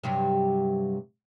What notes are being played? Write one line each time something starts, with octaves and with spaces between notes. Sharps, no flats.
G2 C3 F#3